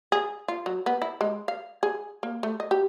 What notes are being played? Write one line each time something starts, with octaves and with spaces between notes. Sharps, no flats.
G#4
F4
F#3
B3
E4
G#3
F5
G#4
A#3
A3
D#5
G4